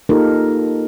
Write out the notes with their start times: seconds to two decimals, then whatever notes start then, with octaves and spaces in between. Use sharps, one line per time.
0.09 A#3 D#4 F4 G4 A4 A#4